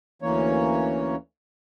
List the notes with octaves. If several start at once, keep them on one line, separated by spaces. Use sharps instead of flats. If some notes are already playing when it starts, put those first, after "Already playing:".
D2 E3 A#3 C#4 C#5